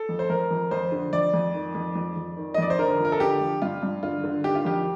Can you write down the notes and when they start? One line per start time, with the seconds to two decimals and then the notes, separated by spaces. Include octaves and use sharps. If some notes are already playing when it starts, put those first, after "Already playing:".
Already playing: A4
0.09 F2
0.19 C5
0.30 F2 A#4
0.51 F2
0.71 F2 C5
0.92 D3
1.13 F2 D5
1.34 F2
1.54 D#3
1.75 F2
1.96 F2
2.16 F2
2.37 D#3
2.54 D#5
2.58 F2 D5
2.70 C5
2.79 D3 A#4
3.00 F3
3.05 A#4
3.12 A4
3.20 D3 G4
3.41 F3
3.62 G2 F4
3.83 G2
4.03 D3 F4
4.24 D3
4.44 D#3 G4
4.55 F4
4.65 F2 G4